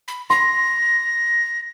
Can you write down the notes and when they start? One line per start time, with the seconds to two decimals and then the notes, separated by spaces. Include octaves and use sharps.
0.08 B5
0.30 C6 A#6